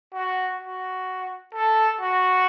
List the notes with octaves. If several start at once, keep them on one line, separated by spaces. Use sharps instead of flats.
F#4
F#4
A4
F#4